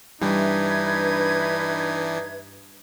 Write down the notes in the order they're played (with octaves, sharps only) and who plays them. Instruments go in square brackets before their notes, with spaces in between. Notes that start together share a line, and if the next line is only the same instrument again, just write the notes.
[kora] G2 [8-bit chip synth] E3 D4 [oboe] D#4 [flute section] B4 E5 G#6